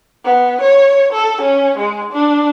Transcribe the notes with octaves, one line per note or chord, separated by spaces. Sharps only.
B3
C#5
A4
C#4
G#3
D4